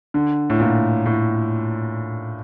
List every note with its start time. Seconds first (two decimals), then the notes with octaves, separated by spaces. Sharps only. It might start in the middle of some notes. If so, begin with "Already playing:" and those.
0.14 D3
0.50 A2
0.60 A#2
1.06 A2